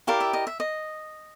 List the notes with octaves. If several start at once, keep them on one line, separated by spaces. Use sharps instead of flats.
E4 G4 A#4 D5 F5
E5
D#5
E5
D#5